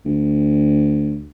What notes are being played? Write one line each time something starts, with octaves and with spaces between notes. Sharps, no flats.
D2